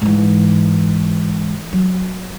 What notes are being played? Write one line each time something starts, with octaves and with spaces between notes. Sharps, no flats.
G#2 E3
F#3